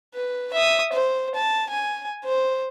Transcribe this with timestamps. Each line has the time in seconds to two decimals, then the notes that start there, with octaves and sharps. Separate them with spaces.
0.15 B4
0.53 E5 D#6
0.93 C5
1.35 A5
1.70 G#5
2.25 C5